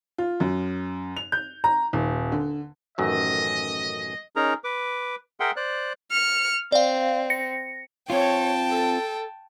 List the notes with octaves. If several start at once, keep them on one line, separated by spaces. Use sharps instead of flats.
F4
F#2
F7
G6
A#5
D#1
D3
A1 F#2 D#3 D#5
C#4 D#4 G#4 A#4 A#5
B4 D6
G#4 A#4 E5 F#5 G5 C6
C5 D5 F#6
F6 C#7
C4 D5 F5
A#6 C#7
C4 F4 C#5 G5 A5
A4